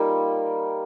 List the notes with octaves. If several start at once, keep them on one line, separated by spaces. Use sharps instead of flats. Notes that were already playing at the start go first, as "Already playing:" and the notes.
Already playing: G3 A#3 D#4 F4 A#4